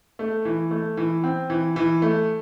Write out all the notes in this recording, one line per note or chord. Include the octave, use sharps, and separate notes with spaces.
A3
E3
A3
E3
C4
E3
E3
A3